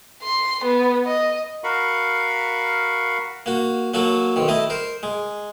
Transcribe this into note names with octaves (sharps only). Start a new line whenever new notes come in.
C6
B3
D#5
F#4 A#4 F5 B5 C#6
A#3 F#4
F#3 A#3 F#4 A4
B1 D#3
A3 E4 D#5
A#4 C5
G#3